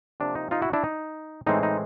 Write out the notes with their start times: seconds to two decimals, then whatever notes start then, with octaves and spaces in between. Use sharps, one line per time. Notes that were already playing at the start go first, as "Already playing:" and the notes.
0.20 C3 F3 A#3 D4
0.35 D#4
0.51 D#4 F4
0.62 E4 F#4
0.73 D4 E4
0.84 D#4
1.46 A2 E3 G#3 C4 D#4
1.63 D#4